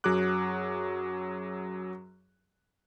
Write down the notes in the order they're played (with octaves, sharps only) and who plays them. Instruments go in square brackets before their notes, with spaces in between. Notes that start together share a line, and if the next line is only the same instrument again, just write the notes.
[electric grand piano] F#2 F#3 F#4 G#4 D6 F#6